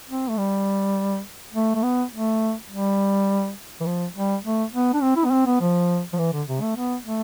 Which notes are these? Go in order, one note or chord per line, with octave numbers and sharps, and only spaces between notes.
C4
A3
G3
A3
A3
B3
A3
G3
E3
F3
G3
A3
B3
D4
C4
E4
B3
C4
B3
F3
F3
E3
D3
C3
A3
B3
A3